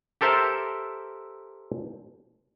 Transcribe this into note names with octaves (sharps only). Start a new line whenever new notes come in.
G4 A4 A#4 C5 E5 A5